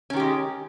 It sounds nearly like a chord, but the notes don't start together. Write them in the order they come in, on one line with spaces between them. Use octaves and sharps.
C#4 D#3 G4 G#3